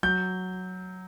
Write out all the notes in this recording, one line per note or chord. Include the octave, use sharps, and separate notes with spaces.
F#3 G6